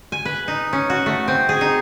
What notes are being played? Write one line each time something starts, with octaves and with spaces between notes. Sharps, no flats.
G#5
B4
D#4
C#4
F#4
A3
C4
G#4
D#4